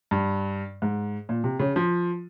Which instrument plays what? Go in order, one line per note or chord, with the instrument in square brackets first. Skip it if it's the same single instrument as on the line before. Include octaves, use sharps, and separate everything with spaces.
[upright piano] G2
G#2
A#2
C3
C#3
F3